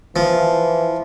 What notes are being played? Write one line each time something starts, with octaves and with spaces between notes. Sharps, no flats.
E3 F3